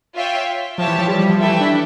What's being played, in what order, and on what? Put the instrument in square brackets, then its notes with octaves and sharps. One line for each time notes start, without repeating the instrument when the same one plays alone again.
[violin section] F4 C#5 E5 G5
[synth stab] F3 [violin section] G4 C#5 E5 A5
[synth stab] E3
F3
G3
G3
F3
[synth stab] E3 [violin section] A3 E4 A4 E5 G5
[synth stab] E3
D4